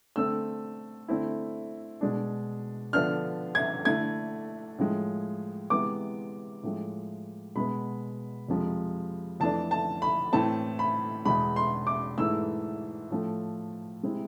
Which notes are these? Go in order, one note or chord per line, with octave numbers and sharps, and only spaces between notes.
D3 A3 C4 E6
D3 A3 C4 E4
B2 G#3 D4
D3 F3 B3 D4 F6
G#6
D3 A3 E4 G#6
A2 F3 G#3
C3 E3 G#3 B3 D6
A2 F3 G#3
B2 G#3 B3 B5
F2 C3 F3 G#3
F2 E3 A3 D4 A5
A5
B5
A2 E3 A3 C4 A5
B5
E2 B2 G#3 B5
C6
D6
G#2 E3 A3 E4 E6
A2 F3 A3
C3 G#3 C4 E4